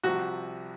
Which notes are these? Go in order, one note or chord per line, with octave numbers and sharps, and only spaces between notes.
C2 C3 F3 F#4